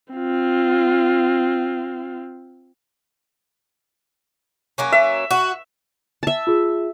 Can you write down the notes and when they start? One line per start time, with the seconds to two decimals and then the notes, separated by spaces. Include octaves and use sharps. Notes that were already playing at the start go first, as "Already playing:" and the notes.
0.14 C4 F4
4.78 F#3 A#3 C#4
4.92 E5
5.31 F#4
6.23 E5 A5
6.47 F4 G#4